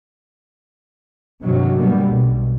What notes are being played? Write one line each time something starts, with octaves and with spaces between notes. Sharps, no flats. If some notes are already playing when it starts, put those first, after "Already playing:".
G2 C3 D#3 F#3
B2 D3 G3 A#3 B3
B1